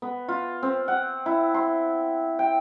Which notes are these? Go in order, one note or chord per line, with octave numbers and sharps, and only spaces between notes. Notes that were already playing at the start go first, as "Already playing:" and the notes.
B3
F4
C4
F#5
E4
C6
G5